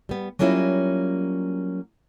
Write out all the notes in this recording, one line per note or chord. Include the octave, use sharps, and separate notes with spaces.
G3 B3
F#3 G3 A#3 C#4 E4 F4